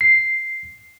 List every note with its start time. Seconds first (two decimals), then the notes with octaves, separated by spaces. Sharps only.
0.01 C7